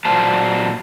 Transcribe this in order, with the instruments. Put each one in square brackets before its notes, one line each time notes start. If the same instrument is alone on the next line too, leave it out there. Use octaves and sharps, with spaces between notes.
[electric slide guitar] A#2 F#3 C5 A5